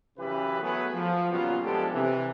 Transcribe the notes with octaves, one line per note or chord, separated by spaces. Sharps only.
F#2 C#3 E3 G4 B4
F#3 A3 B3 G#4 B4
F3
A#2 C#3 F#3 G3 B3 F4
F3 G#3 B3 D4 G4 A4
C3 E3